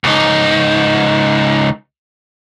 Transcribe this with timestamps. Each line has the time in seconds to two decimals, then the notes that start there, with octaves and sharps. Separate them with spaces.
0.04 C#2 D#4